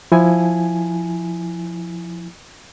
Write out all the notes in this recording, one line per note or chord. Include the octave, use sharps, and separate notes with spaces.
F3 E4 G#5